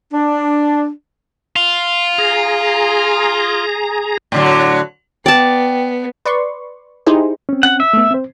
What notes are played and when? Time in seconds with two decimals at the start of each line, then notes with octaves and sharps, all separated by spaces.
0.13 D4
1.56 F4
2.18 G#4 A#5
4.32 A2 D3 F#3
5.26 B3 D5 G5 A5
6.25 B4 D5 C6 C#6
7.06 D#4 E4 G4 G#4 C5
7.49 C4 C#4
7.63 F#5
7.80 E5
7.93 A3 B3
8.11 C4 C5